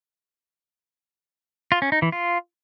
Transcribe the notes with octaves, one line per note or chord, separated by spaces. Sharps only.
F4
C#4
D#4
E3
F4